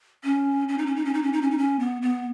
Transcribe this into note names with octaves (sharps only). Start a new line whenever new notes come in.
C#4
C#4
D#4
C#4
D#4
C#4
D#4
C#4
D#4
C#4
D#4
C#4
B3
B3